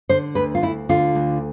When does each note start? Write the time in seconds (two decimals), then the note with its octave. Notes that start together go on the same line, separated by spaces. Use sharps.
0.09 D3 C5
0.35 D2 B4
0.55 F4
0.62 D2 E4
0.89 D3 F4
1.15 D2